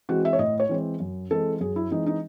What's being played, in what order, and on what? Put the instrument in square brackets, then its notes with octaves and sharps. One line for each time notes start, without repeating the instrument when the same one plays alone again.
[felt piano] E3 G#3 C4 F#4
E5
C#5
A2 D#5
C#5
E3 G#3 C4
F#2
E3 G#3 C4 A4
F#2 G#4
E4
E3 G#3 C4 D#4
D#4